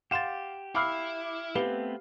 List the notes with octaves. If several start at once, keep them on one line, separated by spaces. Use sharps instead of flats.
G4 F5 F#5 C6 A6 E7
E4 F5 B5 D6 E6 F6 C7
A3 B3 C4 G4 B4 F5 G7